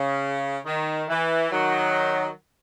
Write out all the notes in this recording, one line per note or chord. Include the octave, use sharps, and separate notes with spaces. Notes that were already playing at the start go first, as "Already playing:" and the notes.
Already playing: C#3
D#3
E3
D#3 F#3